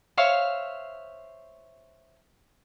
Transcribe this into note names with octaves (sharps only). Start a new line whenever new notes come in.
C5 C#5 E5 F5